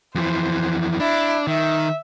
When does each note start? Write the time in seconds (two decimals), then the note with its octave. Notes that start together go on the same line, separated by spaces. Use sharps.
0.15 F2 E3 C5
1.00 D4 E4
1.47 D#3 E5